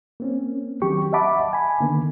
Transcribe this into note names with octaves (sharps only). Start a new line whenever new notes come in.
A#3 C4 C#4
D#3 F#3 G4 C#6
D#5 E5 F#5 A5 B5 D6
G#5 B5
D3 D#3 A#3 B3